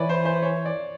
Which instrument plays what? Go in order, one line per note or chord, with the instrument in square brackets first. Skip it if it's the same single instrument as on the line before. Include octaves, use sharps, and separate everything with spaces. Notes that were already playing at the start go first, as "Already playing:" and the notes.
Already playing: [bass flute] E3 [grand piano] B4 C#5 D5
[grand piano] C5
C5
C#5
D5